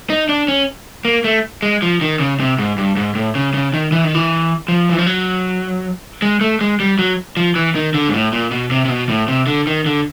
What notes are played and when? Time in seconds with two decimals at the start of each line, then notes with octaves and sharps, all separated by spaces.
0.10 D#4
0.29 D4
0.48 C#4
1.05 A#3
1.24 A3
1.62 G#3
1.82 F3
2.01 D#3
2.20 C#3
2.40 C3
2.58 G#2
2.78 G2
2.97 G#2
3.15 A2
3.35 C#3
3.54 C#3
3.74 D#3
3.92 E3
4.04 D#3
4.15 E3
4.68 F3
4.90 E3
4.99 F3
5.07 F#3
6.22 G#3
6.41 A3
6.61 G#3
6.80 G3
6.99 F#3
7.37 F3
7.56 E3
7.75 D#3
7.94 D3
8.09 G#2
8.14 A2
8.33 A#2
8.51 B2
8.71 C3
8.85 C3
8.90 B2
9.09 A2
9.28 C3
9.47 D3
9.67 D#3
9.86 D3